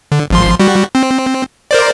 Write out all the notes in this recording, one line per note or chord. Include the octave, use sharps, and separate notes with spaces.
D3
G#1 F3 C6
G3 F#4
C4
A#4 C5 D5